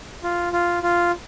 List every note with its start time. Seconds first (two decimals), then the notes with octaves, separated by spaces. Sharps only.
0.23 F4
0.53 F4
0.83 F4